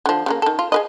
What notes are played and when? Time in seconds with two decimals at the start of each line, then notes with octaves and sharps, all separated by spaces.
0.06 D3 F3
0.26 C#3 F#3 A#3
0.42 D#3 A4
0.59 F4
0.72 G#4 B4 D#5